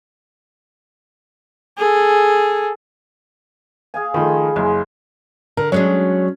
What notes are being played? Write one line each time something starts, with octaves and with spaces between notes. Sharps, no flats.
G#4 A4
G#4 F5 G#5
D#3 F3 A3 B5 C6
F#1 G#3
D3 A#4
F#3 G#3 C#4 D4